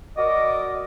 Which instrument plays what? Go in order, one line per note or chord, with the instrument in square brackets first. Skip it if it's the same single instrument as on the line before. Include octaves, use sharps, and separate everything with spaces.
[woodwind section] F#4 A#4 D5 D#5